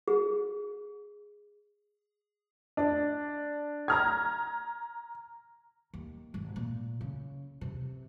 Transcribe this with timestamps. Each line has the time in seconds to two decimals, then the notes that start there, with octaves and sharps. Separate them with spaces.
0.08 G#4
2.77 D4
3.88 A#5 F6 G#6
5.94 D#2
6.34 G#1
6.56 A#2
7.01 C#3
7.61 C3